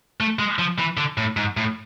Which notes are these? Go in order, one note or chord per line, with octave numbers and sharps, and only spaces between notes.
A3
G#3
F3
E3
D3
A2
G#2
A2